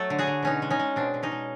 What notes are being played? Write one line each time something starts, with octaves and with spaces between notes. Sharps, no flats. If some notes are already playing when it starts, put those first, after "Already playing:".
Already playing: F#3 A3 A4
D3
F#4 G#4
D3
B2 C#4 D#4
G#3
C#4 D#4
G#3
B2 C4 D4
B2
C#4 D#4
G#3